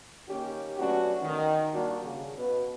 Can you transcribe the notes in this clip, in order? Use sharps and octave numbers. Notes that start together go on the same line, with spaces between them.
D#3 A#3 C#4 G4
F#3 A3 B3 C#4 D4 F#4
D#3
G3 A#3 D4 F#4
C#3
B2 B4